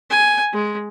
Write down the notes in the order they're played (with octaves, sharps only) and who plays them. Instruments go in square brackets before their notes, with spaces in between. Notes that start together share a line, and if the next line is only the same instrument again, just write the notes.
[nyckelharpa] G#5
G#3